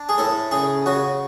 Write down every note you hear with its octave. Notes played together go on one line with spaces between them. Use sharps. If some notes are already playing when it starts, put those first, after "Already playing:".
Already playing: D4
G#4
A2 A4
C#3 G#4
C#3 F#4